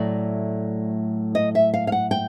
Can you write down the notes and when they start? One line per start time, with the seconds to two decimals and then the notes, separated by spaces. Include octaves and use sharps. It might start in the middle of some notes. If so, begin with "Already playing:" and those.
Already playing: A2 F#3 A3 D5
1.35 D#5
1.55 E5
1.74 F5
1.87 F5
1.92 F#5
2.11 G5